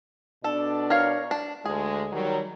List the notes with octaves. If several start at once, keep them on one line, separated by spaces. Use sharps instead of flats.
B2 D4 A4 D5
A#4 C#5 F5
D4
D2 G#3 G#4
D#3 F#3 G3